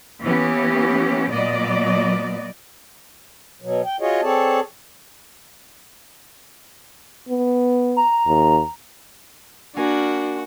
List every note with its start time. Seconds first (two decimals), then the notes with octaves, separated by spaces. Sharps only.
0.22 E3 A#3 B3 C#4 G4
1.31 A#2 F#3 B3 D5 D#5
3.62 B2 F#3
3.85 G5
4.01 F4 F#4 G#4 C#5 D#5
4.23 C4 G#4 A4 C#5 D5 A5
7.29 B3
7.97 A#5
8.27 D#2
9.76 A#3 D4 F#4 A#4 G#5